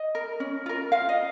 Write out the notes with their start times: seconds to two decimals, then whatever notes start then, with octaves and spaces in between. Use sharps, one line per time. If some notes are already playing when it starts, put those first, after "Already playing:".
Already playing: D#5
0.15 A#4
0.40 C#4
0.66 F4 A#4
0.92 F4 F5
1.09 D#5